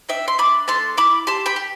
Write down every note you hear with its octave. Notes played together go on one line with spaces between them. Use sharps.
D4 E5 G5
C6
D4 B5 D6
A3 A5 C6
E4 B5 D6
G4 A5 C6
G5 B5
G4